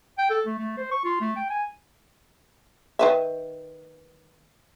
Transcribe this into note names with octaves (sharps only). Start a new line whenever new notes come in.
G5
A4
A3
A3
C5
C#6
F4
A3
G5
G#5
D#3 B4 E5